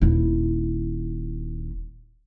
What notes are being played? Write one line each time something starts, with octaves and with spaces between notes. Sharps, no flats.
D#1 E4